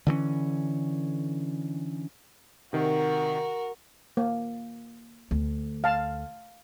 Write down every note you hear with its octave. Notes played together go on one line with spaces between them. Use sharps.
D3 E3 A3 C#4
C3 D#3 F#4 A#4
A#3
D2
F5 A5